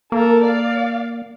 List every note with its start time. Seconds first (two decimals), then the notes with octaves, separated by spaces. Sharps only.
0.12 A#3 A4 A#4
0.45 D5 F5